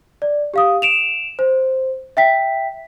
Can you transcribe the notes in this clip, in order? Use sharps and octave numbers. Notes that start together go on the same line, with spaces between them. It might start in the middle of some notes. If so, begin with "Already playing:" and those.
D5
G4 F5 D#6
D7 E7 F7
C5
E5 G5 B6